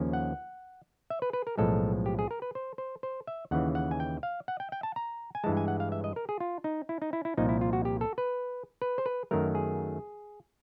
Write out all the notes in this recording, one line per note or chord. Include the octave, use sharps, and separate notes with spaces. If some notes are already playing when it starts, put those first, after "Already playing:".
Already playing: D#2 C#3 F3 A#3 C#4
F#5
E5
B4
B4
A#4
B1 A2 F3 G#3 A4
G4
G#4
A#4
B4
C5
C5
C5
E5
D#2 C#3 E3 F#5
F#5
G#5
G5
F5
F#5
G5
G5
A5
A#5
G#5
G2 E3 G#3 A5
G#5
F#5
F5
E5
D#5
A#4
G#4
F4
D#4
E4
D#4
E4
E4
C2 A#2 F3 A#3 D#4
E4
F4
F#4
G4
A4
B4
B4
C5
B4
F#2 D#3 F#3 A3 A#4
G#4